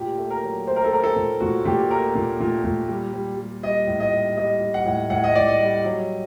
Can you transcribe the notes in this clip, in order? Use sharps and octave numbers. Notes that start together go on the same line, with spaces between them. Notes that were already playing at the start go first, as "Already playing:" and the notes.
Already playing: A#2 G4
A3
A#4
F#3
A3 C5
A#4
A4
A3 A#4
A4
A#2
A#2 F#4
A#2 G4
A3 A#4
A#2
A#2
A#2
G3
G3
G3
G3 D#5
A2
D#5
G3
G3 D#5
G3
F#5
A2
A2 F#5
D#5
A2 D5
D#5
G3
F#3